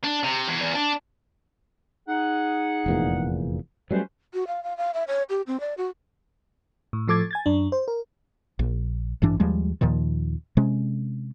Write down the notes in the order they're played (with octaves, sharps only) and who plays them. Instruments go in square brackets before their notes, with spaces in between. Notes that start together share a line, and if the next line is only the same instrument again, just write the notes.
[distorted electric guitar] D4
C3
E2
E2
D4
[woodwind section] D#4 G#4 F#5
[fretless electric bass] F1 E2 A#2
[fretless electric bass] F#3 G3 A3 [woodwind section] C#4 B4 C5
[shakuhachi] F#4
F5
F5
F5
E5
C#5
G4
C4
D5
F#4
[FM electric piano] A2
A2 F3 A4 D6 G#6 A6
G#5 G#6 A6
F#2 D4
C5
A#4
[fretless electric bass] A#1
A1 G2 E3 D4
D#2 F3 G3 G#3
D#2 A#2 D#3 F3
C3 G#3 C#4